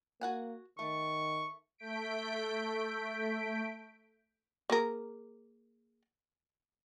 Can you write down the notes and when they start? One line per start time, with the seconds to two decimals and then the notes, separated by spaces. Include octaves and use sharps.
0.21 A#3 F#4 F#5 G#5
0.79 D#3 A3 C#6
1.78 A3 G6 B6 D7
4.70 A#3 G#4 A#4